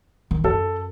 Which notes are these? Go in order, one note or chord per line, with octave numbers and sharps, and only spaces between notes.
D#3
F#2 A4